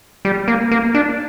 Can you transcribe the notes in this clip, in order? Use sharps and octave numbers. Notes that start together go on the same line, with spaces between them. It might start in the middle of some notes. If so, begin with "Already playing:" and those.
G3
A#3
A#3
D4